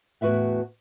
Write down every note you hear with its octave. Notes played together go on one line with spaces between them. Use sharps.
E2 A2 F#4 B4 E5 F#5